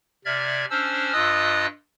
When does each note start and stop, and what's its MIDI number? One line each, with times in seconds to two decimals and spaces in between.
0.25 0.65 48
0.25 0.65 74
0.25 0.65 76
0.25 0.65 89
0.25 0.65 92
0.70 1.13 61
0.70 1.13 62
0.70 1.13 72
0.70 1.13 88
0.70 1.13 89
1.13 1.66 43
1.13 1.66 65
1.13 1.66 75
1.13 1.66 87
1.13 1.66 88
1.13 1.66 90